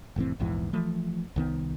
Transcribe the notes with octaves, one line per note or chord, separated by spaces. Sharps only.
F1 A2 E3 C4
A#1 E2 G#2 E3
E3 F3 A3
C2 D#3 B3